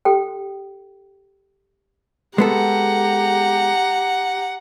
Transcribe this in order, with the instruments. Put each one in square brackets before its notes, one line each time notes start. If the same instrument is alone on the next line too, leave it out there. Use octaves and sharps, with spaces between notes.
[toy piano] G4 A4 G5
[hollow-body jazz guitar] G#3 B3 A4 [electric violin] G4 A#5 [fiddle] F#5